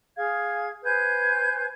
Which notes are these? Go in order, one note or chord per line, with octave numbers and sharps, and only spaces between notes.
G#4 F5 G#6
B4 C5 G#5 G6